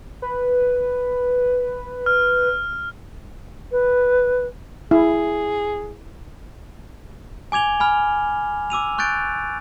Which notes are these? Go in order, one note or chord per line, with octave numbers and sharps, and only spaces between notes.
B4
F6
B4
E4 G#4
G#5 D6 G#6 F7 G7
G#5 B5 F6
D6 E6 D#7 F7
C#6 F#6 G6 A6 D7